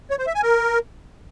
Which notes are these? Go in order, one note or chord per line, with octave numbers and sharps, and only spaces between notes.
C#5
C5
E5
G#5
A#4